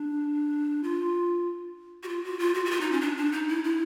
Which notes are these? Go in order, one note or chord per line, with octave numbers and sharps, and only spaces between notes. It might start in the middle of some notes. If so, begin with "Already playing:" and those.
Already playing: D4
F4
F#4
F4
F#4
F4
F#4
F#4
F4
D#4
C#4
D4
D4
D#4
E4
E4